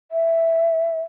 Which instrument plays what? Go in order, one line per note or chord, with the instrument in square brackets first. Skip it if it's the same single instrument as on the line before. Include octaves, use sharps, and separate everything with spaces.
[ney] E5